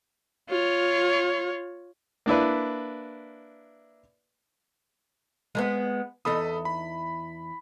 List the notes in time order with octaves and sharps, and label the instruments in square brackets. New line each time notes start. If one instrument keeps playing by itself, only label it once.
[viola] F4 C#5
[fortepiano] A#3 D4 E4 B4
[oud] G#3 A3 B3
[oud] E2 D#4 [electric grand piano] A4 B5 D#6
[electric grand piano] B5